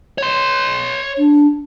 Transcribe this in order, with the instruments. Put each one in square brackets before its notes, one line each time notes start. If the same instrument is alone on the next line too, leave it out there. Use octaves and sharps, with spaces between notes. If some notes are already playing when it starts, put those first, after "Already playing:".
[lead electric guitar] C#5 C6
[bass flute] D4